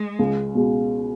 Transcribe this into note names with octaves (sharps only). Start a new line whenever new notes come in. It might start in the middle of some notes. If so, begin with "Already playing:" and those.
Already playing: G#3
C#2
B2 G#3